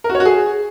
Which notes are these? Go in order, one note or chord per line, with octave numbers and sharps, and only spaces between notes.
A#4
F#4
C#5
F#4
G#4